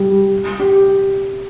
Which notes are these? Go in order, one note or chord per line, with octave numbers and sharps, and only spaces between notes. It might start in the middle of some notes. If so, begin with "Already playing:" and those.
Already playing: G3
G4